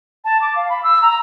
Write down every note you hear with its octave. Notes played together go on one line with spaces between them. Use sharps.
A5
D6
F5
B5
E6
A#5